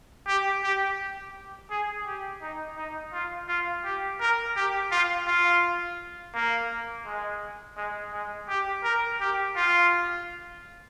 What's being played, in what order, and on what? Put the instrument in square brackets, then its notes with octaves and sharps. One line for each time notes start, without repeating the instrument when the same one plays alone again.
[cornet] G4
G4
G#4
G4
D#4
D#4
F4
F4
G4
A#4
G4
F4
F4
A#3
G#3
G#3
G#3
G4
A#4
G4
F4